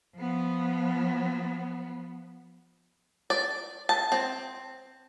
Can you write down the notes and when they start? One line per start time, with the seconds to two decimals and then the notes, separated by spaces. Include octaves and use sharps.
0.17 F3 B3
3.30 D5
3.89 A5
4.12 C4